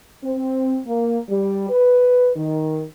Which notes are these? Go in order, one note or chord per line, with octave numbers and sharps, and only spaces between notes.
C4
A#3
G3
B4
D#3